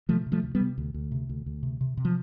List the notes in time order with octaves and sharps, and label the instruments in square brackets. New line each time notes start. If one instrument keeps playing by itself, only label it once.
[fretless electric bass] C3 F3 A3
C3
F3 A3
D2
G3 B3
C3
D2
D2
C3
D2
D2
C3
C3
C3
F3